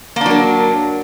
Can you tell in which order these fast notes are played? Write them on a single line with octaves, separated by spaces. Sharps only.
A#3 D4 F#3 A#4